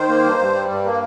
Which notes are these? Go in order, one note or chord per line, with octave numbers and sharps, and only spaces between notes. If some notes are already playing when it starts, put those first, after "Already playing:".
Already playing: D#3 C5
A#3
G2
G2
G3
G2
A#3